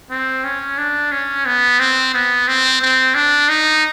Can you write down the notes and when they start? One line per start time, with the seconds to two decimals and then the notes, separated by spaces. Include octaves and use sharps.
0.10 C4
0.45 C#4
0.78 D4
1.12 C#4
1.46 B3
1.80 C4
2.14 B3
2.48 C4
2.81 C4
3.15 D4
3.49 D#4